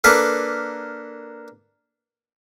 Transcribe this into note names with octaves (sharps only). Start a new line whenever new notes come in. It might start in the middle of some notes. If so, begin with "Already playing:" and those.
A#3 D4 A4 B4 F5